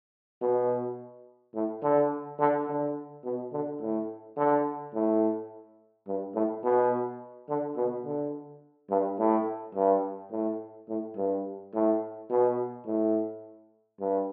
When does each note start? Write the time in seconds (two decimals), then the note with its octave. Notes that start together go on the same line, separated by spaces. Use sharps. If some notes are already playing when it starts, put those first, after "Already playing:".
0.41 B2
1.54 A2
1.83 D3
2.39 D3
2.68 D3
3.24 B2
3.53 D3
3.81 A2
4.37 D3
4.94 A2
6.07 G2
6.35 A2
6.64 B2
7.49 D3
7.76 B2
8.05 D3
8.90 G2
9.19 A2
9.75 G2
10.31 A2
10.89 A2
11.17 G2
11.74 A2
12.30 B2
12.86 A2
14.00 G2